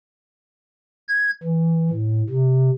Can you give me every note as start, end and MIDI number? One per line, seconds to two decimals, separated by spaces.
1.09 1.31 92
1.43 1.90 52
1.90 2.22 45
2.30 2.70 48